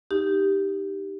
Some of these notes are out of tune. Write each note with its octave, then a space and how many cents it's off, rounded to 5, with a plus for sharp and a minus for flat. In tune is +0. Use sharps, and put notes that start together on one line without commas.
D#4 +0 G4 +0